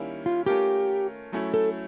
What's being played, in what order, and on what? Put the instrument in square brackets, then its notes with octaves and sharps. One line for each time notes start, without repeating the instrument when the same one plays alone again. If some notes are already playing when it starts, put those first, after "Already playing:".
Already playing: [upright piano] D#3 G3 A#3 C#4 E4
[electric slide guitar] F4
[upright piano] A3 C#4 F4 A#4 [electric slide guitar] G4
[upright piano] F#3 A3 C#4 E4
[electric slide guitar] A4